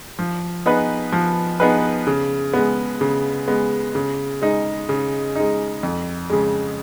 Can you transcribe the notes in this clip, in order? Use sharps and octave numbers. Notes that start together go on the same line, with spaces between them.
F3
B3 D#4 G#4 B4
F3
B3 D#4 G#4 B4
C#3
G#3 B3
C#3
G#3 B3
C#3
G#3 D#4
C#3
G#3 D#4
F2
C#3 G#3